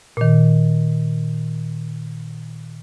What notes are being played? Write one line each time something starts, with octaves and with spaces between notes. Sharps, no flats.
A#2 D#3